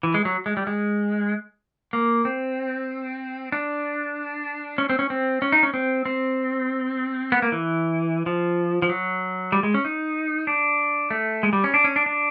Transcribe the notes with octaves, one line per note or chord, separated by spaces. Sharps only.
E3
G#3
F#3
G#3
G3
G#3
A#3
C4
D4
C#4
C4
C#4
C4
C#4
D#4
C#4
C4
C4
B3
A#3
E3
F3
F3
F#3
G3
G#3
C#4
D#4
D4
A3
G#3
G3
C#4
D4
C#4
D4
D4